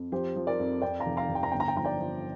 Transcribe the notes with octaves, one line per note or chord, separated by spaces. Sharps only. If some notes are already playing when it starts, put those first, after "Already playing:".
Already playing: F2
F3 G4 C5
F3
A#4 D5
F2
F2 D5 G5
F5 A#5
F1
F5 A#5
F1
G5
A#5
G1 G5
A#5
G5
F3 A#5
D5 G5
F3